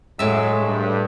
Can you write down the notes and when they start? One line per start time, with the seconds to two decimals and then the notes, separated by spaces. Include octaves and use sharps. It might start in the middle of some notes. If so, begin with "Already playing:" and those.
0.19 A2 F#3 G#3 E5
0.60 G2